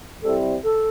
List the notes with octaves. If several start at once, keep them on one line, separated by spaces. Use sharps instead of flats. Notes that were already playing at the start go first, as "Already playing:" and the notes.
C3 G3 C4 E4 A4
A4